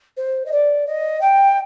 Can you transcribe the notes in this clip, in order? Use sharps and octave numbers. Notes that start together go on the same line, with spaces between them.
C5
D#5
D5
D#5
G5